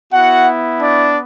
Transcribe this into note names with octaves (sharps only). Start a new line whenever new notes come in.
B3 E4 F#4 F#5
D4 D5